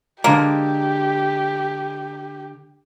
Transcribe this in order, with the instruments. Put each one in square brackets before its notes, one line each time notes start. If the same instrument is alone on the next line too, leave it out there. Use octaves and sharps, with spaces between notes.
[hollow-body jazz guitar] D3 G#3 [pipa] A#3 [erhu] G4